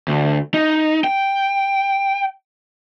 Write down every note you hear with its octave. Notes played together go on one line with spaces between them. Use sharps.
D2
D#4
G5